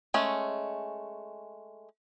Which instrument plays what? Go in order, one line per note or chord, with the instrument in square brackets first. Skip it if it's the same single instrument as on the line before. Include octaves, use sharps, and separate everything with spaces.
[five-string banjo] G#3 A3 C#4